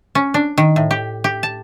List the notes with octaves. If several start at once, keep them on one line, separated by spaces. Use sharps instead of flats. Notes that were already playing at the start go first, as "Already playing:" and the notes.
C#4
D4
D#3
A2
G4
G4
A5